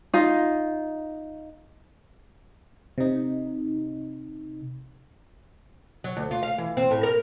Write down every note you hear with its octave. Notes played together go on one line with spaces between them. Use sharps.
D#4 F4
C3 D#4
F#3
D2
F4
F5
E3
C4
A2
A#4